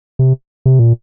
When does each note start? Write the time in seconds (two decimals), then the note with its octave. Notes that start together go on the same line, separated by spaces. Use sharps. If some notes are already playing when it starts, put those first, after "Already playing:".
0.19 C3
0.66 C3
0.79 A#2